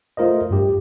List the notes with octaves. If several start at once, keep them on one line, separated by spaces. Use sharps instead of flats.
A3 F4 A#4 C5 D#5
G2 G4